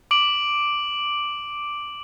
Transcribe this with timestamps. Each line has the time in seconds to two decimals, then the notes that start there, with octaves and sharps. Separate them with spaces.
0.11 D6 D7 F#7